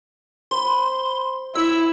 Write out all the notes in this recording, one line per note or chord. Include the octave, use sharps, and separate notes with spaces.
C5 B5 C6
E4 E5 E6